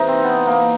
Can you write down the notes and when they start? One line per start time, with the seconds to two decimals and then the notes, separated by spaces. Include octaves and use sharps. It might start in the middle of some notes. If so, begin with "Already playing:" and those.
Already playing: C3 E3 D#4
0.08 C4
0.24 B3
0.47 A#3